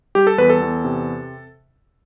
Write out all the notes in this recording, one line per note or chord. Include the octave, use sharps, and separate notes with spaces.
G3 G4
A4
E2 B4
A4
E2
C3